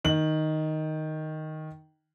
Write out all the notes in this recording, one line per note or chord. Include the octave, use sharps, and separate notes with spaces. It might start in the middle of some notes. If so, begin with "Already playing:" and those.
D#3 F#7